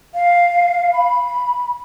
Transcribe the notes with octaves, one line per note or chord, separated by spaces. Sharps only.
F5
B5